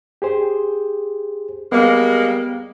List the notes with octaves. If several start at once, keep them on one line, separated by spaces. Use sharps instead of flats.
G4 G#4 C5
G3 G#3 A#3 B3